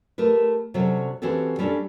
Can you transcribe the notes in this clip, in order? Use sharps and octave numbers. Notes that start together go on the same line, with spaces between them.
A3 G4 A#4 B4
C3 F#3 G3 C#4 A4
E3 C4 C#4 F#4 G4 A4
G3 C#4 D4 F#4 G4 A4